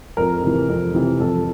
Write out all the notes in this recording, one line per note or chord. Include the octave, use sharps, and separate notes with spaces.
F2 A#4
C3 E3
F2
C3 E3
F2 A4